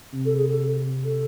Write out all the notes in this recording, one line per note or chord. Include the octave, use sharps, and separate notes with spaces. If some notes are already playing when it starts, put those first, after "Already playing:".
C3
A4
G#4
A4
A4